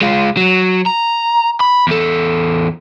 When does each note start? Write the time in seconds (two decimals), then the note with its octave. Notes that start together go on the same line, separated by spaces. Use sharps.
0.01 G#3 F4
0.37 F#3
0.86 A#5
1.60 B5
1.87 E2 A4